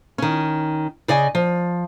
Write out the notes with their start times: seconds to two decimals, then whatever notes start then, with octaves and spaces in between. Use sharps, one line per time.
0.18 D#3 C#4
1.08 C#3 D5 D#5 G#5
1.35 F3